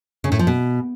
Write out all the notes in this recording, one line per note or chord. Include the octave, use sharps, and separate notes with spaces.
C#3
A2
F3
B2